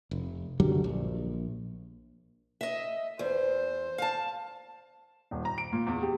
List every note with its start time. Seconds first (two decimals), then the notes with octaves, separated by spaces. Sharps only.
0.11 F1
0.60 F#2 D3 F#3 G3
0.84 A#1
2.61 D#5 E5
3.19 E2 C5
3.98 F5 A5
5.31 D#1
5.45 A#5
5.58 D7
5.72 A#2
5.87 E2
6.03 G4